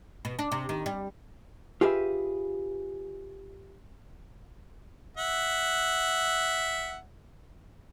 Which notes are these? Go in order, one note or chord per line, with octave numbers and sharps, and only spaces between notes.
B2
D4
C3
D#3
G3
F4 G4 G#4 B4 E5
E5 F#5